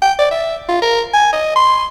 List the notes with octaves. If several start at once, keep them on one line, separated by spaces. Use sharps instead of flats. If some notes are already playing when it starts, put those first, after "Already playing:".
G5
D5
E5
F4
A#4
G#5
D#5
C6